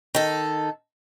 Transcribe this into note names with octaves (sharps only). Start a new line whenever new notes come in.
D#3 A4